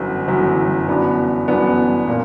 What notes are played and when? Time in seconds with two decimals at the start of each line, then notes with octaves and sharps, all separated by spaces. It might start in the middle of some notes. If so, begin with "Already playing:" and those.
Already playing: G1 F#2 E3
0.28 G1 F#2 E3
0.88 G1 F#2 E3 B3 D4
1.48 G1 F#2 E3 B3 D4
2.07 A#2 A#3